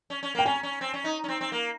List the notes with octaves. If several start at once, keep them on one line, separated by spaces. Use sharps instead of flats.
C#4
C#4
A#3 G5
C#4 G#5
C#4
C4
C#4
D#4
C#4
C4
C4
A#3